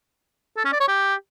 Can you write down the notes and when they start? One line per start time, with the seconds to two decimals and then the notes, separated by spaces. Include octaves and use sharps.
0.57 A4
0.65 C#4
0.73 D5
0.80 C#5
0.88 G4